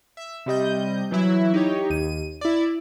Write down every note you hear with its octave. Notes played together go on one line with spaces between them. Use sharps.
E5
C3 G3 D#5 G6
E3 F#3 E4
D#4 G4 C#5
D#2 D#7
E4 D5